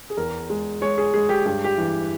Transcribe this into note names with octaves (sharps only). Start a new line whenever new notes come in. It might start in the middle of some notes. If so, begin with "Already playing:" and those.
G#4
E2 A#4
G#3
G#3 C#5
G#4
G#3 G#4
G4
G2 G4
G4
E3